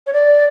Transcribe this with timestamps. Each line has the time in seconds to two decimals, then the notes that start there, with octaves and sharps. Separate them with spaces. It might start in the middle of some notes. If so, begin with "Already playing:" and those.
0.07 C#5
0.13 D5